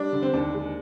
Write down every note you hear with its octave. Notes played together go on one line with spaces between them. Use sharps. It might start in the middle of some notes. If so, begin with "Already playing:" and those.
Already playing: G3 D4
D3
C4
D#2 D4
G#3